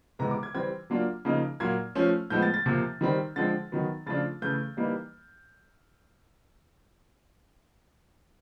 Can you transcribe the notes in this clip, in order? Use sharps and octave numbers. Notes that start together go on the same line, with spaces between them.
C3 E3 G#3 B3 A#5
D6
G#6
E3 G3 C4 G#6
F#3 A#3 D4 F4
C#3 F3 A#3 D#4
A#2 F#3 A#3 G#6
F3 A3 C#4 F4
A2 F3 G#3 B3 G6
A6
A6
C3 F3 A#3
D#3 G3 C4
D3 F3 G#3 C4 A6
D#3 F#3 B3
C#3 F3 A3 D4 F4 A6
C#3 E3 A3 G6
E3 G3 A#3 D#4